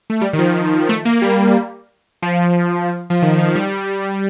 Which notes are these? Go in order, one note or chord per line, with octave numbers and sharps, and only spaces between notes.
A3
G3
D#3
F3
A3
A#3
G3
F3
F3
D#3
F3
G3